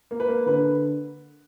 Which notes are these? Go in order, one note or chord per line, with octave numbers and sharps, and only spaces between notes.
A#3
B4
A#3
D3 B4